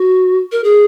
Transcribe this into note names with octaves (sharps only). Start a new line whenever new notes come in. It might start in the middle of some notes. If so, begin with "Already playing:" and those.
Already playing: F#4
A#4
G#4